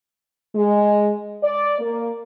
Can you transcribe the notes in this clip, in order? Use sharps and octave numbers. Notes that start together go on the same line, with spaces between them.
G#3
D5
A#3